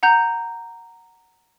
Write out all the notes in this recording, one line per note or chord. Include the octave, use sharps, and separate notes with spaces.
F#5 A#5 G6